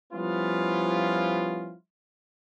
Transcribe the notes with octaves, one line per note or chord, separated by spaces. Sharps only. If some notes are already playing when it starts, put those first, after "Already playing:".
F3 G3 B3 C#4 E4 F4